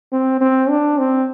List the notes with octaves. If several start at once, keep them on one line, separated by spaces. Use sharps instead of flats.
C4
C4
D4
C4